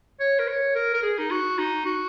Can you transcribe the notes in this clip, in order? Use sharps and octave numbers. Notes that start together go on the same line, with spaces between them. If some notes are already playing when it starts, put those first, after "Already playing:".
C#5
A#4
C#5
A#4
A#4
G#4
D#4
F#4
D#4
F#4